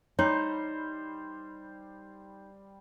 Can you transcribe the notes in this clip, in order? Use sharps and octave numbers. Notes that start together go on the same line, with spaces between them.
G3 D#4 C5 C#5